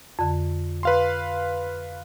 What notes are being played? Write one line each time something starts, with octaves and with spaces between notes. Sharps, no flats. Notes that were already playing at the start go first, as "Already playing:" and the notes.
F2 D3
B4 F5 C6